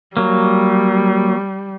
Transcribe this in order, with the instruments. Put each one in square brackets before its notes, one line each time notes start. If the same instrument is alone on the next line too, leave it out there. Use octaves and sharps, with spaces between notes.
[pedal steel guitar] F#3 A#3 [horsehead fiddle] G3